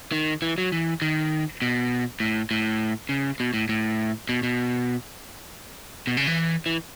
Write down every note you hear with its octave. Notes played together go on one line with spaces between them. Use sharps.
D#3
E3
F#3
E3
D#3
B2
A2
A2
C#3
B2
A2
A2
B2
B2
B2
C#3
E3
E3